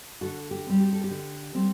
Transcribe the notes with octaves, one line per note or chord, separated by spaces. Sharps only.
D3 F#4 A4
G4
G3 C4
G4
A4
G4
D3
G3 C4